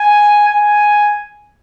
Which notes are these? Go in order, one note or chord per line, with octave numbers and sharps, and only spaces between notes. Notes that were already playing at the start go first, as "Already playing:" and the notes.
Already playing: G#5
G#5